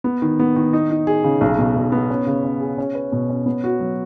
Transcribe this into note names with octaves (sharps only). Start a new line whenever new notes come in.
B3
D#3
B3
D#3
D#4
D#4
G#4
C#3
B1
B2
B1
B3
C#4
C#3
C#4
G#4
C#4
B4
B2
C#4
B3
F#4
F#3